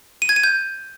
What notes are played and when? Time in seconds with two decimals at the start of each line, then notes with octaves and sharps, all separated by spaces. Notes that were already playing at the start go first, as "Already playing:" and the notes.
0.22 D#7
0.29 G#6
0.36 D#7
0.44 G6